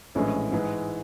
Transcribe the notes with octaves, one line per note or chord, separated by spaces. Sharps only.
A#1 A2 E3 G#3 C#4
G#2 E3 G#3